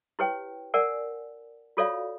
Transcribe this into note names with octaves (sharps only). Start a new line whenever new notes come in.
E4 G4 B4 C#5 G5
A#4 D5 F#5 G#5
F4 F#4 A4 C#5 D5 F5